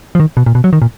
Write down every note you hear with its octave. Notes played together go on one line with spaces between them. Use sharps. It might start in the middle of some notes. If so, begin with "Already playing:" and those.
F3
D#3
B2
A#2
B2
F#3
D#3
A#2